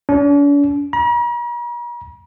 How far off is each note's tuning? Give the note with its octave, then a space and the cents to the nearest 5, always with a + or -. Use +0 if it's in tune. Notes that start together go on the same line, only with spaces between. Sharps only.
D4 -45
A#5 +45